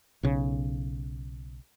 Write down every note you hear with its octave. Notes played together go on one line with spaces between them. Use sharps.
B1 C#3